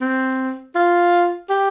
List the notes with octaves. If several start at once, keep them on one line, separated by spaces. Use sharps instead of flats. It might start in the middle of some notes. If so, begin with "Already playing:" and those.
C4
F4
G4